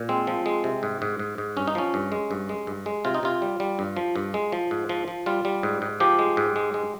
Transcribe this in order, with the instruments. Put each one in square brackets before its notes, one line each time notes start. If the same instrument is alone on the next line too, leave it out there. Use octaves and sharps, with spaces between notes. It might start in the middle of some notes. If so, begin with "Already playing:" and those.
Already playing: [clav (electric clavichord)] A#2
G#3 C4
F3
G#3
C3
G#2
G#2
G#2
G#2
G2 C#4
D#4
F3 C#4
G2
G#3
G2
G#3
G2
G#3
C3 F4
D#4
C3 F4
G3
G3
G2
F3
G2
G#3
F3
G#2
F3
F3
G3 F4
G3
G#2
G#2
F3 G4
G#3
G#2
G#3
G#3